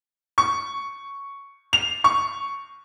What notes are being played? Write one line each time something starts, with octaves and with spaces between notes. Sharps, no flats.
C#6
F7
C#6